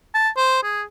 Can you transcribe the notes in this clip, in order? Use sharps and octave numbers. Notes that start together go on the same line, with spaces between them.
A5
C5
G#4